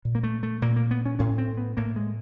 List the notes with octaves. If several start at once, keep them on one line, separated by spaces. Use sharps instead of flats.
A#2
A#3
A3
A3
A#2 A#3
A#3
B3
C#4
A2 C#4
C4
B3
A2 A#3
G#3